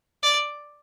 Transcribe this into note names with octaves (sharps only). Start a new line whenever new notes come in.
D5